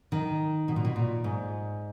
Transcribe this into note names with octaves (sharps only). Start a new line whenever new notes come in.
D#3
B2
A#2
B2
A#2
G#2